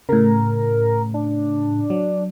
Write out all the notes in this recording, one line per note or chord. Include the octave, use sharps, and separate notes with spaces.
A2 C#3 A#4
D4
F#3